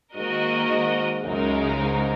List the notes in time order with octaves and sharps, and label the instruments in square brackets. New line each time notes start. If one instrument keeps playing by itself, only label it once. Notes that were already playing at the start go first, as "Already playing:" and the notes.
[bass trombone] G#2 [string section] D#3 A#3 F#4 A#4 D#5
[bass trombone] G#2
[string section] C#2 C#3 G#3 D#4 A#4 [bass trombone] F#2
[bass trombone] G#2